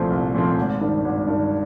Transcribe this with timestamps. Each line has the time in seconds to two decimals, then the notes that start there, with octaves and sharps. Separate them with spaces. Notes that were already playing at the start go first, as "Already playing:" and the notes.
Already playing: C2 A#2 F3 A3 C4
0.10 C2
0.34 A#2 F3 A3 C4
0.58 G#1
0.81 G2 D#3
1.05 G#1
1.27 G2 D#3